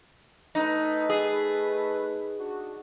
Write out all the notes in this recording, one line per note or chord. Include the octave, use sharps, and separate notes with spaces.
A3 D#4 B4
G#4
D4 F#4